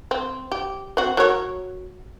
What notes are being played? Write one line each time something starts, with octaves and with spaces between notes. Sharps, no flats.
C4
G4
C4 F#4
F#3 A#4 C#5